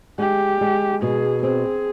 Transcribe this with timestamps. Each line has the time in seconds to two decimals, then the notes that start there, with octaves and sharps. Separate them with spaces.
0.18 G#3 G4
0.61 G#3
1.02 B2 G#4
1.43 C4 G#4